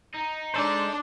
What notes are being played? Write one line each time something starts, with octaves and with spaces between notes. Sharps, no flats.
D#4
G#3 D4 A4 C5